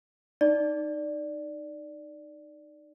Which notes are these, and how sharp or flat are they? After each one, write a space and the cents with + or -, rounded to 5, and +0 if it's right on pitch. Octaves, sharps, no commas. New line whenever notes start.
D#4 -15 D5 +0